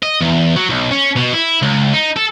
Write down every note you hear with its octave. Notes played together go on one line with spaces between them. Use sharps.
D#5
E2
F#3
B1
C#4
B2
E4
C#2
D#4
A4